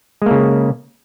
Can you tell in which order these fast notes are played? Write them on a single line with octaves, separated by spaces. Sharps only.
G#3 A#3 C#3